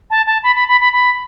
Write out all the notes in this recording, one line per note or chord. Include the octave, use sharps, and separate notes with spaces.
A5
A5
B5
B5
B5
B5
B5